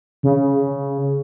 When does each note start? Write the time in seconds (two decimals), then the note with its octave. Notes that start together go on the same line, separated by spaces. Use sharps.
0.23 C#3